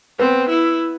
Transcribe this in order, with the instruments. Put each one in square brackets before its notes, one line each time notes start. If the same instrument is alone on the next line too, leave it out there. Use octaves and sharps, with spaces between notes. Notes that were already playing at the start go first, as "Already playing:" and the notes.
[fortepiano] B3 [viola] C4
[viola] E4